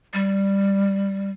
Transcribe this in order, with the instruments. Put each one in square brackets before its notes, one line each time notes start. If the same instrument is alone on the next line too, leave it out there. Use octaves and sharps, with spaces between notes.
[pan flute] G3